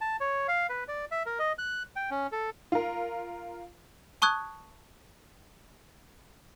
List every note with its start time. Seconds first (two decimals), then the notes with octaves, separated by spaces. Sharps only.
0.01 A5
0.20 C#5
0.48 F5
0.69 B4
0.88 D5
1.11 E5
1.26 A#4
1.39 D#5
1.58 F#6
1.96 G5
2.11 C#4
2.32 A4
2.72 F4 A#4
4.22 A5 C#6 D#6 F#6 G#6